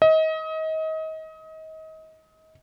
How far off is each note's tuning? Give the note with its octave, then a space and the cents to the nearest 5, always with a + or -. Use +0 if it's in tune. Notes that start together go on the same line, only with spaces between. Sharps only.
D#5 +30